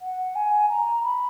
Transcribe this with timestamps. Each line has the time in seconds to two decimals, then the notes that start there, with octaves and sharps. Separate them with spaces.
0.02 F#5
0.36 G#5
0.69 A#5
1.03 B5